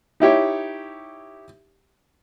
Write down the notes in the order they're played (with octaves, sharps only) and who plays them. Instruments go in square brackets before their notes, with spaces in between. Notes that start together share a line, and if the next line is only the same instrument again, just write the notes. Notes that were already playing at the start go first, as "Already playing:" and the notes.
[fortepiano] D#4 E4 G4 C#5